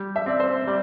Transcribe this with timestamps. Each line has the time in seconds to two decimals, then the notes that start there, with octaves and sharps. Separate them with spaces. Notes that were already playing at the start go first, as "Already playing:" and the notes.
Already playing: G3
0.16 E5
0.26 C4 D5
0.40 C5
0.67 G3 D5